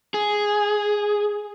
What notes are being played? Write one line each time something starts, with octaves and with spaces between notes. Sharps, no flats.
G#4